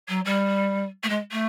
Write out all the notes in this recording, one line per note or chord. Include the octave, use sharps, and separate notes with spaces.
F#3
G3
A3
G#3
A3